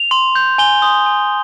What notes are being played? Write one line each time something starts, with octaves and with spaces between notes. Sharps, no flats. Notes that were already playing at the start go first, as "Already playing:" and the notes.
Already playing: F7
C6
G6
G#5 G7
C6 D#6 G6
G#5